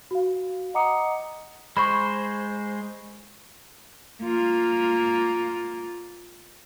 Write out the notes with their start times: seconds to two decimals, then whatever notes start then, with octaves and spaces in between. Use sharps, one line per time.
0.11 F#4 F5
0.74 D#5 F#5 A#5 D6 D#6 C#7
1.77 G#3 C5 B5 C#6
4.23 A#3 F4